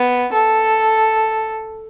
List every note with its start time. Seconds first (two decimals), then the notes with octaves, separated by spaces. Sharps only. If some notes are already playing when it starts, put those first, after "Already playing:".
Already playing: B3
0.33 A4